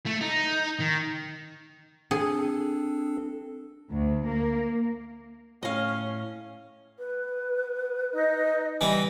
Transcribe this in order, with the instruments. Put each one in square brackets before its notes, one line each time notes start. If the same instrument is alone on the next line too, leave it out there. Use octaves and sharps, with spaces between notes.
[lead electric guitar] A3
D#4
D#3
[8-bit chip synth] C4 D4 A4 [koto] G#4
[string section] D2
A#3
[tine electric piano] A2 [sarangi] C#4 [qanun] D#5 F5
[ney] B4
[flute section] D#4 D#5
[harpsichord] E3 G3 [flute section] D#5